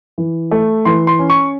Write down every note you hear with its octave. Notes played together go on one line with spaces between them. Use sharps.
E3
A3
E3 C6
C6
C#4
C#6